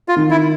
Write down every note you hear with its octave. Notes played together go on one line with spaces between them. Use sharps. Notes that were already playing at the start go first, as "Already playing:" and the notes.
F4
D#3
E4